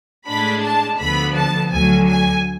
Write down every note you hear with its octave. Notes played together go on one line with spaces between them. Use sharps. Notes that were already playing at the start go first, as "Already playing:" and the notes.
A2 G#3 D4 B5
A5
D2 D3 F3 B3 B5
A5
D2 D3 F#3 G#5
G#5